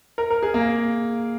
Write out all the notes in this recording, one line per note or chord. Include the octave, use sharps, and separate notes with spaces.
A#4
A#4
G#4
A#3